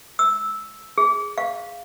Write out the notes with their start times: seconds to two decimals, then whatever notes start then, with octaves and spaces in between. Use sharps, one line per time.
0.19 E6
0.98 G#4
1.38 F5